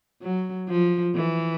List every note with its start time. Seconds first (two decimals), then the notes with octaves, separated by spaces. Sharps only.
0.22 F#3
0.68 F3
1.15 E3